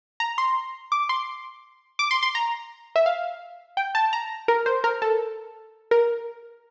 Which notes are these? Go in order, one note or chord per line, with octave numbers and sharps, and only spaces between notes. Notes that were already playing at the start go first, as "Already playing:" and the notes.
A#5
C6
D6
C6
D6
C6
C6
A#5
E5
F5
G5
A5
A#5
A#4
C5
A#4
A4
A#4